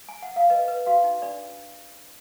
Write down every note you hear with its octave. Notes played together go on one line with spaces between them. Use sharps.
G#5
F#5
F5
B4 D#5
B4
F#4 F5
D#4
D4 D5